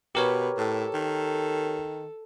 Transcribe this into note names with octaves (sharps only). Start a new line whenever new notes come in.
B2 G4 A#4 B4 C#5
A2 A4
D#3